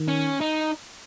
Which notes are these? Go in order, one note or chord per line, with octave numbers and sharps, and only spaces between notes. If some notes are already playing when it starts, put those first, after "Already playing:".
Already playing: D#3
C#4
D#4